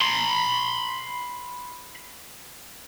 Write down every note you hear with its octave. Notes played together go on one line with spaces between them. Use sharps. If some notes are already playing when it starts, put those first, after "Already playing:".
B5 C6